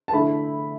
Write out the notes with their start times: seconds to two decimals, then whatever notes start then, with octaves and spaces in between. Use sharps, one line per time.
0.08 A5
0.13 D3 A3 E4 B5